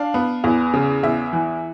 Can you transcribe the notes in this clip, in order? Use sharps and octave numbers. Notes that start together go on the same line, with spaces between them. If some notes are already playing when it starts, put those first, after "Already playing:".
Already playing: D4 F5
B3
E2
C#3
E2 E5
E3